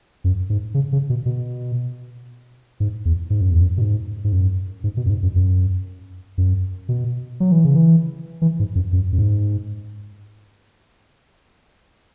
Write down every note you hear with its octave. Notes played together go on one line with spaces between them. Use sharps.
F#2
G#2
C#3
C#3
B2
B2
G#2
E2
G#2
F#2
E2
F#2
B2
G#2
G#2
F#2
G#2
B2
F#2
G#2
F#2
F#2
F#2
B2
F#3
E3
C#3
E3
E3
G#2
F#2
F#2
F#2
G#2